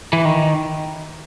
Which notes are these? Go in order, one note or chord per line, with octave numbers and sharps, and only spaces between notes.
E3
D#3